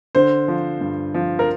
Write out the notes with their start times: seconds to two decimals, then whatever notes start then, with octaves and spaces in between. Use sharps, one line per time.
0.15 D3 C5
0.48 F3
0.81 G2
1.14 F3
1.39 A#4